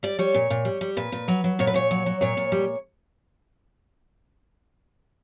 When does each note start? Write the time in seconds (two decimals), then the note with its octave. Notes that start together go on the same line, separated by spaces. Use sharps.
0.03 G3 D5
0.19 G3 C#5
0.34 A#2
0.50 A#2
0.65 G3
0.81 G3
0.97 A#2 B4
1.12 A#2
1.28 F#3
1.44 F#3
1.59 A#2 C#5
1.67 B4
1.74 A#2 C#5
1.91 F#3
2.06 F#3
2.21 A#2 C#5
2.37 A#2
2.52 G3